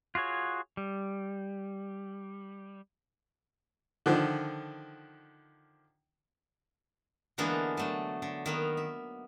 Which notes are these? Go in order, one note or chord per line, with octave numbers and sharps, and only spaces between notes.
F4 F#4 G#4 C#5
G3
D3 D#3 F3
D3 E3 G#3 A#3 B3 D4
F#3 A3 D4
D3
D#3 A#3 B3
E5